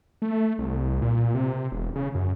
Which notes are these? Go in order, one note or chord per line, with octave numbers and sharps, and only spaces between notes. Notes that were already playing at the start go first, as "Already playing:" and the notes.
A3
C2
A#2
C3
E1
C#3
F#2